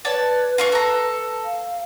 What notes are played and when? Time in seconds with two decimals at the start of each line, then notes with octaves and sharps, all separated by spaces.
0.05 B4 C#5 D5 A5
0.58 F4 F5 C#6
0.72 A4 A#5
1.45 F5